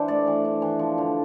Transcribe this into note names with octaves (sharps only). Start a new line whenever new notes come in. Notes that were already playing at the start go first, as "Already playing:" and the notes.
Already playing: E3 D4 C5 E5
A3 D5
E3
D4
E3
F3
D3